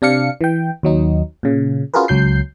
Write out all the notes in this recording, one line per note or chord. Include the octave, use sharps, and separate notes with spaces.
C3 D4 F5 C#7
E3 G5
D#2 F#3 D#4
A#2 C#3
C#4 F4 F#4 G#4 A#4 B4
C#2 F#3 G6 C7